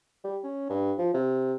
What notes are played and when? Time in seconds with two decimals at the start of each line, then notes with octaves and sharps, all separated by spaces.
0.24 G3
0.44 C#4
0.70 G2
0.98 F3
1.14 C3